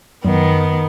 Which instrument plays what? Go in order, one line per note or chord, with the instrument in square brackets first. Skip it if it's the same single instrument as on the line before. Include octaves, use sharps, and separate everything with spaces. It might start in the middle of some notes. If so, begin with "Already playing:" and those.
[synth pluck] F#2 [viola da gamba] D#3 B3